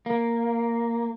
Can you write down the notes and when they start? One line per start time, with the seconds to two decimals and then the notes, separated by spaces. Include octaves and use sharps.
0.06 A#3